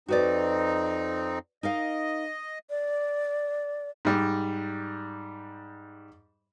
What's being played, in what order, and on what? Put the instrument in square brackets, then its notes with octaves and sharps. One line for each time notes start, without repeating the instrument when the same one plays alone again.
[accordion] F2 C4 D#4 [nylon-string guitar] F#4 B4 D5
[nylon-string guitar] D#4 A#4 F5 [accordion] D#5
[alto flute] D5
[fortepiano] G#2 G3